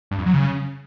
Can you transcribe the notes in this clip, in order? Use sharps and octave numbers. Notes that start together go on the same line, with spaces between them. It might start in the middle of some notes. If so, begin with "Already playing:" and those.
G2
F2
F#3
C#3